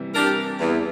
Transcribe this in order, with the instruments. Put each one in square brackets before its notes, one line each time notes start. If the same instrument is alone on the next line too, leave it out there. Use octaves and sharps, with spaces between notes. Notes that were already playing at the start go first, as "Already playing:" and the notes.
Already playing: [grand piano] C3 E3 G3
[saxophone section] D4 G4 A#4
E2